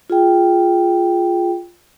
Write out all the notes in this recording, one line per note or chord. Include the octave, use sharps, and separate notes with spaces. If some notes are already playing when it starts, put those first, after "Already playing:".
F4 G#4 G5